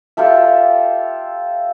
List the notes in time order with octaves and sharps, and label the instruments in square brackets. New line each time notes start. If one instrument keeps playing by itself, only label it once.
[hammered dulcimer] F4 G4 A4 E5